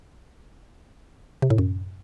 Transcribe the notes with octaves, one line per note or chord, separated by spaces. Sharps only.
C3
A2
F#2